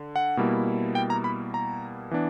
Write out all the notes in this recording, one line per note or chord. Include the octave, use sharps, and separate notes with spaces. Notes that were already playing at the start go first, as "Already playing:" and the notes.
Already playing: D3
F#5
B2 G3 A#3 E4
G5
A#5
B5
A#5
E3 B3 D4